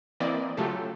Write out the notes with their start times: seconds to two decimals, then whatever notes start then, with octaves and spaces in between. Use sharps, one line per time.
0.20 E3 A#3 C4 E4 D5 D#5
0.57 C#3 F#3 A3 F4 G4 A4